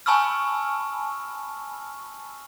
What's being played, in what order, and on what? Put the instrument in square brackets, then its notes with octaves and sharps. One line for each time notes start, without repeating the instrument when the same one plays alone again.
[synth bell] G#5 A5 B5 C#6 E6 F6